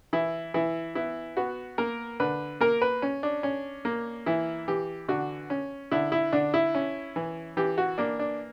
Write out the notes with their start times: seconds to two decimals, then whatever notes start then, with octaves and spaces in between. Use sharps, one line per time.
0.13 E3 E4
0.54 E3 E4
0.95 B3 E4
1.37 B3 F#4
1.78 A#3 A#4
2.20 D3 B4
2.61 A#3 A#4
2.82 B4
3.02 C#4
3.23 D4
3.43 C#4
3.85 A#3
4.26 E3 E4
4.68 E3 G4
5.08 D3 F#4
5.50 C#4
5.91 D3 E4
6.12 E4
6.33 D3 D4
6.54 E4
6.75 C#4
7.16 E3
7.57 E3 G4
7.78 F#4
7.98 A#3 D4
8.19 D4